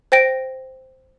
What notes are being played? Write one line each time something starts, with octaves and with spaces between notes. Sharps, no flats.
C5 G5 A#6 D7